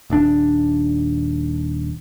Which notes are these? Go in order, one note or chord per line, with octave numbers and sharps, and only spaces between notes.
D#1 D4